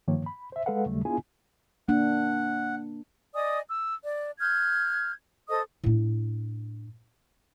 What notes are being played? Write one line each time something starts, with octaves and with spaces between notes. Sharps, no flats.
G2 D#3 F3 A#3 C#5
B5
C5 E5
G#3 A4 B4 F5 F#5
D#2 C#3 F#3 G3 A3
B3 D4 E4 F4 G#4 G#5
A#3 D4 F#5
D5 D#5 G#5 D#6
E6
D5
F6 G6 G#6
A4 C5 D#5 D#6
A2 D4